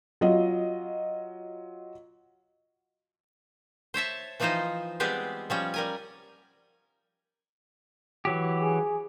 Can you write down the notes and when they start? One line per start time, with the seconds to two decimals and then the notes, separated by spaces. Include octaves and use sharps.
0.21 F#3 F4 D#5
3.94 C5 C#5 E5 A5
4.40 E3 F3 D#4 F4 C5 D#5
5.00 G3 G#3 B3 C4 G4 G#4
5.50 F3 G3 C#4
5.74 G3 A#4 G#5
8.25 E3 F#3 G4
8.61 G#4